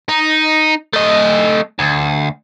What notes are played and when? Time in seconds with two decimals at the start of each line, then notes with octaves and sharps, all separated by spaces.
0.09 D#4
0.93 A3 D#5
1.79 D2